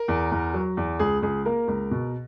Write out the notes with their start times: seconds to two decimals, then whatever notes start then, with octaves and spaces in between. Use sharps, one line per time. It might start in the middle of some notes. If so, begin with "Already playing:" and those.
Already playing: A#4
0.08 E2
0.32 E2
0.54 F#3
0.77 E2
0.99 C#2 G#4
1.22 C#2 G#4
1.45 A#3 A#4
1.68 C#2
1.91 B2